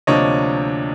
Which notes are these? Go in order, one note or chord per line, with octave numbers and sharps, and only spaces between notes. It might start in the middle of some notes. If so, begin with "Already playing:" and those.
D2 C3 F3 A#3 D4 C#5 D#5